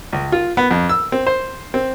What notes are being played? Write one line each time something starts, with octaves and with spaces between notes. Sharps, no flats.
C#2
F4
B3
F2
E6
C4
C5
C4